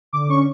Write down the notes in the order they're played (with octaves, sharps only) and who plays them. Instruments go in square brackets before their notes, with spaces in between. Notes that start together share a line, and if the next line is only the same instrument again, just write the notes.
[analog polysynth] D3 D6
C#4 C#6